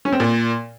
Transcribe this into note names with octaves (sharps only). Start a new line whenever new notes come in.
C#4
C4
A#2